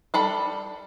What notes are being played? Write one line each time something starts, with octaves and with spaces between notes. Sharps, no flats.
G3 A4 B5